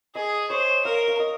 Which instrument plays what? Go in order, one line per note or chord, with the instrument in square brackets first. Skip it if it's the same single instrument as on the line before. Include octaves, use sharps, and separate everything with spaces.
[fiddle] G#4 [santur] D#5
[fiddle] C5 [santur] C#5
[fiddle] A#4 [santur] F5
[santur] F5
D#5